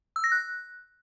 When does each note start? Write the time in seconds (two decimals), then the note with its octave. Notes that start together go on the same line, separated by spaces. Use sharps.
0.16 E6
0.24 A#6
0.32 F#6